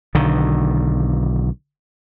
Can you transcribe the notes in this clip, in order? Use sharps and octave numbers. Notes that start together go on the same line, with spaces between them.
B1 D3 D#3